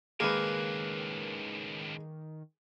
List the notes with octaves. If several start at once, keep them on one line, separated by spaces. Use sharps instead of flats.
C#2 A2 D#3 G#3 A#3 B4